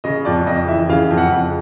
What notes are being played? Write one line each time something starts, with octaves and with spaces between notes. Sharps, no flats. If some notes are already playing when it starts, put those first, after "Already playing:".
C#3 D#5
F2 D5
F2 D#5
E3 E5
C#3 F5
F2
F#5
F2